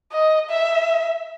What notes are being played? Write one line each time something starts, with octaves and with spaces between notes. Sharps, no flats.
D#5
E5